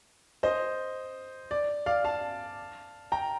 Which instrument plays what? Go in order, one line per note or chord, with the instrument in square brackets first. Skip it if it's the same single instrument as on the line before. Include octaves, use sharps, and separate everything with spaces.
[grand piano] C5 D#5
D5
D5 F5
F5 A5
G5 A#5